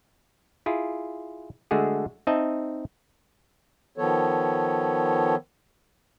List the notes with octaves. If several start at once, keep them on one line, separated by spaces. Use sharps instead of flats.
E4 F4 G#4
D3 G#3 A3 F#4 G#4
C4 D#4 D#5 E5 A5
D#3 F3 B3 A4 C#5